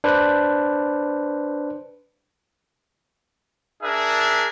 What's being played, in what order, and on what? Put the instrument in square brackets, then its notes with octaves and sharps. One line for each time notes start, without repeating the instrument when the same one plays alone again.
[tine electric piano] D4 B4 C5
[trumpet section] D4 G#4 A#4 E5